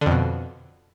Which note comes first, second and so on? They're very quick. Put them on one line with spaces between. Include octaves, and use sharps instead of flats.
D3 F2 B2